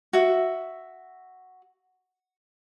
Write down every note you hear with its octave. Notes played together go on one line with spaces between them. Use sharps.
F#4 E5